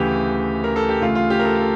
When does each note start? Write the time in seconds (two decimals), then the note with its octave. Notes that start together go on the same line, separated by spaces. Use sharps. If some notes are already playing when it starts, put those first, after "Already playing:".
Already playing: D2 C#3 E3 G4
0.64 A#4
0.76 A4
0.89 G4
1.01 D2 C#3 E3 A3 F4
1.15 F4
1.30 G4
1.39 A#4
1.45 A4
1.59 A4